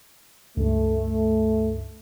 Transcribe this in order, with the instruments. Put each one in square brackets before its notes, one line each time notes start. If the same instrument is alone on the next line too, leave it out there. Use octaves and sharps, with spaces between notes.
[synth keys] C#2 G2 [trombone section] A3